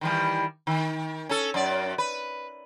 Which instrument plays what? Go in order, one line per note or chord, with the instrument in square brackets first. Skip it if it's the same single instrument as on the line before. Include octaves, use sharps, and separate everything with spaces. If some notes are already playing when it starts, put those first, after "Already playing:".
[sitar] D#3 E3 G3
D#3
C#4 A4
F#2 D5
B4